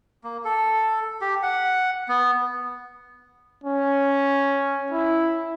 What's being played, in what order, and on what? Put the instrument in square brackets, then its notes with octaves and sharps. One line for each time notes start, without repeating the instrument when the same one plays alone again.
[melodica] A#3
A4
G4
F#5
B3
[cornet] C#4
E4